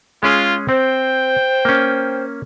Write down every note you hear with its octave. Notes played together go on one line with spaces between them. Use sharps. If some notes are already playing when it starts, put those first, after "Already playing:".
G#3 C#4 F4 G#4
C4 C5 G5
A#3 C#4